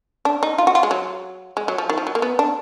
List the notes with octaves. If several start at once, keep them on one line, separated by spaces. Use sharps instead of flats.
D4
D#4
F4
F#4
F4
G#3
F#3
G#3
F#3
F3
D#3
F3
F#3
A#3
B3
D4